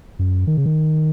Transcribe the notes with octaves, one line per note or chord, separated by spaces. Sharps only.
F#2
D#3
C#3
D#3